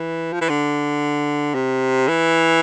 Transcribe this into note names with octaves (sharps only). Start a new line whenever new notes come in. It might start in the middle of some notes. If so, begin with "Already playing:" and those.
Already playing: E3
F3
E3
D3
C3
E3